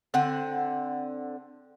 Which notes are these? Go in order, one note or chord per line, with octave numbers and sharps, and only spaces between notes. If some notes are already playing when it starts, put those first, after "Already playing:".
D3 C4 F#5